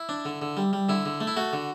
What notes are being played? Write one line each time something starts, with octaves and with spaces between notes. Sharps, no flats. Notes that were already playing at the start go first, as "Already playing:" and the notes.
Already playing: E4
D4
D3
D3
G3
G3
D3 E4
D3
A3
E4
A3 F#4
D3